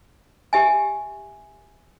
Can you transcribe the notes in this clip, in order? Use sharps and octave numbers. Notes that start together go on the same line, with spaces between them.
G4 E5 G#5